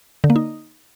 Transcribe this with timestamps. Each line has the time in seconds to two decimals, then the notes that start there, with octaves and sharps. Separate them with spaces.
0.24 D3
0.30 A#3
0.36 D#4